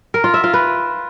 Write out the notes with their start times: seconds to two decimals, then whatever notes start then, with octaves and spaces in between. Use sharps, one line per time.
0.14 A#4
0.24 F4
0.34 E5
0.44 F4
0.54 B4